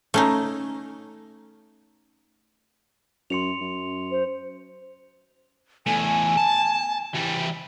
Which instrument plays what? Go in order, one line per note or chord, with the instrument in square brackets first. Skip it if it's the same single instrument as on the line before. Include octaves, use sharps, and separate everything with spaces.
[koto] A3 C#4 D#4
[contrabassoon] F#2 [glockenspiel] C6 C#7 F7
[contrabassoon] F#2
[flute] C5
[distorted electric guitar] E2 A3 [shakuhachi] G#5
[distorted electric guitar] A5
E3 G3